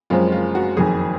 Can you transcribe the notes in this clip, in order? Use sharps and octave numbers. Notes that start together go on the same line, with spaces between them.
F#1 F#2 F3 G#3 C4 F4
F4
F#4
F#1 F2 D#3 G#4